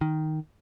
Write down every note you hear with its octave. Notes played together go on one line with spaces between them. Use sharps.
D#3